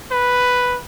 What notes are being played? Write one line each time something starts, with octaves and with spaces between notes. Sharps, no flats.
B4